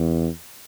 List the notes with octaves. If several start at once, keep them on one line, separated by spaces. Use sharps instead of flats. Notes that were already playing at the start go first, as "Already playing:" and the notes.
Already playing: E2